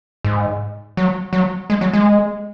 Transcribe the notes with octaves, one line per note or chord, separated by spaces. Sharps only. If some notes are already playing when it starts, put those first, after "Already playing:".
G#2
F#3
F#3
G#3
F#3
G#3